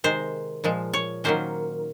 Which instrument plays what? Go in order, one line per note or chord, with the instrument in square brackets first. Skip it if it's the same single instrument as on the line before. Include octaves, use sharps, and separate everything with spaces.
[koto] C3 D#3 G#3 C5
A#2 F3 G#3
C#5
D#3 F#3 A#3 C#4 C5